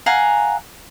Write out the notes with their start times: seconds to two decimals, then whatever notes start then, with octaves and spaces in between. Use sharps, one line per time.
0.06 F5 F#5 G#5 A#5